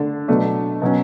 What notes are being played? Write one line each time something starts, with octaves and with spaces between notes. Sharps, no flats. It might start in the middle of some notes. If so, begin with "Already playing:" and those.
Already playing: D3 A3 D4 A5
B2 F#3 A3 D4
B2 F#3 C#4